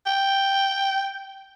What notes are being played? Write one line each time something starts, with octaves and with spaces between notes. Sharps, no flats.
G5